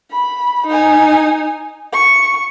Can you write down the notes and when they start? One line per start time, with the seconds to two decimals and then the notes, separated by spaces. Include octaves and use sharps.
0.12 B5
0.66 D#4 G#5
1.93 C#6